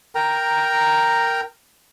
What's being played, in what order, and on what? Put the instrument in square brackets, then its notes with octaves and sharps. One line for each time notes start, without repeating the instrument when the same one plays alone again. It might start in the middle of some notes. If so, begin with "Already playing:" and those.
[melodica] A#4 G5 A#5